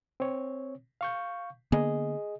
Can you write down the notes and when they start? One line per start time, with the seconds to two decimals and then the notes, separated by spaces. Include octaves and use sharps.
0.20 C4 C#5
1.01 F5 C#6 G6
1.72 D3 A#3 B3 G#4 D#5